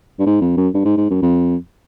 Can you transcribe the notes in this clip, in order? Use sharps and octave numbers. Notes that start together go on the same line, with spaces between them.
G2
G#2
F2
F#2
G2
G#2
G#2
F#2
F2